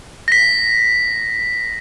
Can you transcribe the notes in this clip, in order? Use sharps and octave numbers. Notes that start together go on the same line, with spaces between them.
A#6 B6